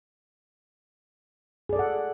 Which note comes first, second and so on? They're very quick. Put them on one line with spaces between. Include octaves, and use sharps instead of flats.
G#4 D5 A4 F#5